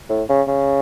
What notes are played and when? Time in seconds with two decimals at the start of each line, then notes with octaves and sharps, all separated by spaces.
0.09 A2
0.29 C#3
0.48 C#3